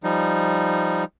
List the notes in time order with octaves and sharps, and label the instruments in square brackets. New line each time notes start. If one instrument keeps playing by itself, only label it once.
[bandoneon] F3 G3 D#4